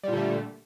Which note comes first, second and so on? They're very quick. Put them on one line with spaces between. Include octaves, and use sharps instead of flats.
G3 A#2 D3 A3